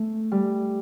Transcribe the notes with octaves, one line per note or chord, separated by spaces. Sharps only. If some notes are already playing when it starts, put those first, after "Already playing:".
Already playing: A3
G3